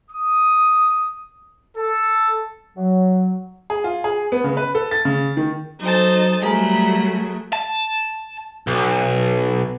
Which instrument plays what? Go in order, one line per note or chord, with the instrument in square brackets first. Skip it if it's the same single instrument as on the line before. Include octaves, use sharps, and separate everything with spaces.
[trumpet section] D#6
A4
[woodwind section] F#3
[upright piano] G#4
F4
G#4
B3
C#3
B4
A4
A6
C#3
D#3
[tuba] F#3 [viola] D#4 A4 [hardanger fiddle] C5 A5
[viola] F#3 A3 [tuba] G3 [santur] G#4 A#4 [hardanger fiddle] B5
[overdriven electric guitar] A5
B1